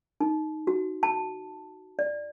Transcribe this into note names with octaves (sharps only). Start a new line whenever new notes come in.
D#4
F#4
A5
D5